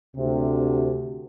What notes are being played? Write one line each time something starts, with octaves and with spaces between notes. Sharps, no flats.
D2 C3